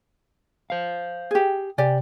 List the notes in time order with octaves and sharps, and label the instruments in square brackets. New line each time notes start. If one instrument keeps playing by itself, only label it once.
[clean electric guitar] C5 F5
[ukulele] G4 G#4
[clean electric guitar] C3 [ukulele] G4 D5 G#5